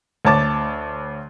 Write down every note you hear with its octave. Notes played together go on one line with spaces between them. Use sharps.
D2 C#5 A5 D6 A6